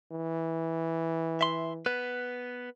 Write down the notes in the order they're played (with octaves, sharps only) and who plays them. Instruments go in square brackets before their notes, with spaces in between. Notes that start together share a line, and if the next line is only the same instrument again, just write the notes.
[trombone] E3
[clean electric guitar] E5 C6
B3 B4